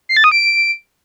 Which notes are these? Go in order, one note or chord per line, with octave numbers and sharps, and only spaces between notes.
C7
A6
D#6
D7